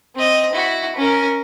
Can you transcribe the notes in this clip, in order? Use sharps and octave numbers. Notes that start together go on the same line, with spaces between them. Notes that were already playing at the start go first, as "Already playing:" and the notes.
C4 D#5
E4 F#4
C#4 A#4